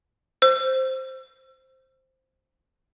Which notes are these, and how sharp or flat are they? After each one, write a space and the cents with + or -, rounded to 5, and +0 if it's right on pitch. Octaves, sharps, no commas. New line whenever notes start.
C5 +0 E6 +35